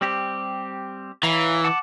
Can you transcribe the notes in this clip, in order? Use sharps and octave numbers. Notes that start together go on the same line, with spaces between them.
G3 C4 G4
E3 C#5 F5 A#5
F#5 A5 D6